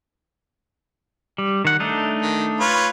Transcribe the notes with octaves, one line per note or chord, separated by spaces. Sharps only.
G3
D#3 F#5
A3 D4 D#4
D#3
F4 B4 C#5